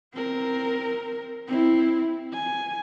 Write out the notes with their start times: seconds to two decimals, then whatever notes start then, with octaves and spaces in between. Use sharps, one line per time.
0.14 C4 A#4
1.47 C4 E4
2.33 G#5